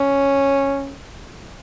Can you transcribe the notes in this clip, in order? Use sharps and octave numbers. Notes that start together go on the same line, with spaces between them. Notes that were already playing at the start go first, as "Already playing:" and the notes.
Already playing: C#4